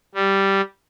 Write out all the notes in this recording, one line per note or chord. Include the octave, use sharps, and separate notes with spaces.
G3